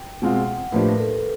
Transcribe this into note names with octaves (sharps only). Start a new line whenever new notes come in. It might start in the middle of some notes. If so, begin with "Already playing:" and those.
Already playing: G5
B2 G#3 C4 F4 F#5
A2 F3 A#3 D4 G4 B4
A#4
A4